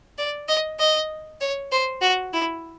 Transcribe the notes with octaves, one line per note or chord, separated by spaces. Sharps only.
D5
D#5
D#5
C#5
C5
F#4
E4